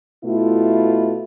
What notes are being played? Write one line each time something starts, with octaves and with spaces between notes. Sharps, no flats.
B2 A3 E4 F4